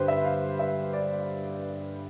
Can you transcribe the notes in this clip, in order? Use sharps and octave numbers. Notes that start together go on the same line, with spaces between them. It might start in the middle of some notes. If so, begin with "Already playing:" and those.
Already playing: G2 D3 G4 B4 C5
E5
F5
E5
D5